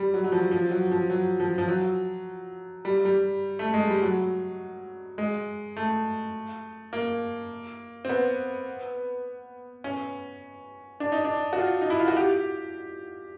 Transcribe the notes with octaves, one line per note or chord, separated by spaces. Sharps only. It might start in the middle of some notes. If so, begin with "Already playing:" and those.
Already playing: G3
F#3
F#3
F3
F3
F#3
F3
F#3
F3
F3
F#3
G3
G3
A3
G#3
G3
F#3
G#3
A3
A#3
C4
B3
C#4
D4
D#4
D4
F#4
F4
D#4
E4
F4
F#4
G4